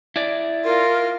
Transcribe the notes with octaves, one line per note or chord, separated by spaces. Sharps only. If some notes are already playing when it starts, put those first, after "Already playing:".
E4 D5
F4 A#4